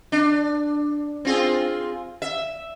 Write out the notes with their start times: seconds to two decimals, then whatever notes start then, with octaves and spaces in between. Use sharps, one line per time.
0.12 D4
1.25 C4 F4 G#4
2.22 E5